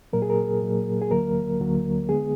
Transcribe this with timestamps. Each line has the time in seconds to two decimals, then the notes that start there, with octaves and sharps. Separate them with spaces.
0.13 A#2 F#3 A#3 A#4
0.22 G#4
0.30 A#4
0.62 A#2 F#3 A#3
1.02 G#4
1.11 D2 D3 F#3 A#3 A#4
1.60 D2 D3 F#3 A#3
2.09 D3 G#3 B3 G#4